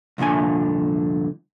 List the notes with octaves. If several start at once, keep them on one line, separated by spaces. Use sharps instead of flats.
C2 F2 A#2 D3 G#5